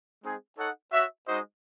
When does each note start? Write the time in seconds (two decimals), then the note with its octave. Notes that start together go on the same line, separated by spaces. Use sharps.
0.22 G#3 C4 D#4 G#4
0.57 D#4 A4 C#5 F#5
0.91 F#4 C#5 E5
1.27 G#3 D#4 F#4 C5 D#5